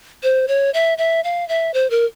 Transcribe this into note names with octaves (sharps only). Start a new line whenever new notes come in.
C5
C#5
E5
E5
F5
E5
C5
A#4